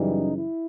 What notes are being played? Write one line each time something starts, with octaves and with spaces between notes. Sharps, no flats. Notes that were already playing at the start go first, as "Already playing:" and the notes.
Already playing: F#2 C#3 E3 G3 D#4
E4